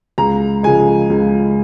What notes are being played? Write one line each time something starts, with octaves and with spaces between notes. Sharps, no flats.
C#2 A#5
C#3 F3 G#3 G#5
C#2